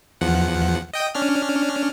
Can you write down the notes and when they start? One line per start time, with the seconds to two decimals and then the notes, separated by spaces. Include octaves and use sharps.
0.21 E2 F3 F#5
0.93 D#5 G5 D#6
1.15 C#4 D4 F6